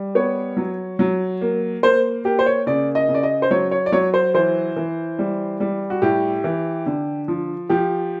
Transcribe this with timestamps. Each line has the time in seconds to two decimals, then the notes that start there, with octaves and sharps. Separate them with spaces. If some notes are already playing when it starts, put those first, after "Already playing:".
Already playing: G3
0.15 B3 C#5
0.57 F#3
0.99 F#3
1.41 A#3
1.83 A#3 C5
2.25 A#3 G4
2.39 C5
2.46 C#5
2.67 C#3 D5
2.95 D#5
3.09 C#3
3.14 D5
3.23 D#5
3.42 C5
3.51 F#3 C#5
3.71 C#5
3.86 D5
3.92 F#3 C#5
4.14 C5
4.34 E3 C5
4.76 E3
5.19 G3
5.60 G3
5.90 F#4
6.02 A2 G4
6.44 E3
6.86 D3
7.28 F3
7.69 F3 G4